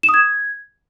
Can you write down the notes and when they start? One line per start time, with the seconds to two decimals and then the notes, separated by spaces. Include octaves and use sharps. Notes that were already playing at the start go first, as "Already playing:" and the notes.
0.03 E7
0.09 D#6
0.14 G#6